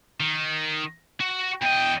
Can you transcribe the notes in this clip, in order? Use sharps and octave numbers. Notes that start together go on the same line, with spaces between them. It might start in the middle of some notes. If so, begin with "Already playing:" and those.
D#3
F#4
E2 D#5 G5